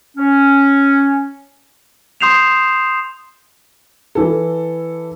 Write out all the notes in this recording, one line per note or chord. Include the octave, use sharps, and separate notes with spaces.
C#4
C6 D#6 G6 C7 E7 F7
E3 A4